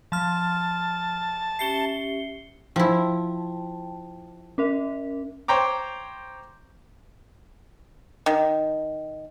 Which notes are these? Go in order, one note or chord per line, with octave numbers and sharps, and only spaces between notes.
F3 A5 F6
C#4 G4 E5 C7 C#7 G7
F3 E4 G5 A5
C#4 A#4 E5
C5 C#5 G5 A#5 D6
D#3